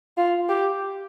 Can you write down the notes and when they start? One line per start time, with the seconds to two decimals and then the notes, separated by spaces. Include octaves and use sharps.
0.17 F4
0.49 G4